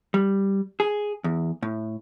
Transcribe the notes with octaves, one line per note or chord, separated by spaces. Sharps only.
G3
G#4
E2
A2